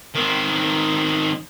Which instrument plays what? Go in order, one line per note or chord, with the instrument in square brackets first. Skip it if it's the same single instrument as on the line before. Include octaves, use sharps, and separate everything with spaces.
[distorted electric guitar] D#3 C4